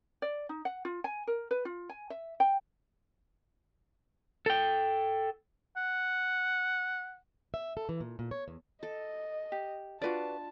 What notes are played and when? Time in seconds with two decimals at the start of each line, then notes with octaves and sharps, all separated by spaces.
0.22 D5
0.49 D#4
0.65 F#5
0.85 F4
1.04 G#5
1.27 A#4
1.51 B4
1.65 F4
1.89 G#5
2.10 E5
2.40 G5
4.46 A4 G5
5.76 F#5
7.54 E5
7.77 A4
7.89 E3
8.00 A#2
8.19 A#2
8.31 C#5
8.48 E2
8.83 A4 D#5
9.52 G4
10.02 D4 F4 F#4 B4 D5 A5